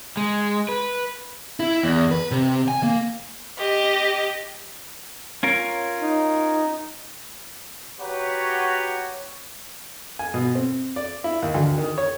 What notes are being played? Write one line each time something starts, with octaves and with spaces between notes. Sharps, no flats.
G#3
B4
E4
E2
B4
C3
G#5
A#3
G4 D#5
C#4 F4 A#4
D#4
F#4 G4 B4 C#5 F#5 A#5
G#5
B2
C4
D5
E4
D#2
D2
D#3
C#5